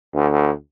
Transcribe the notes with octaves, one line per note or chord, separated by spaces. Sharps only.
D2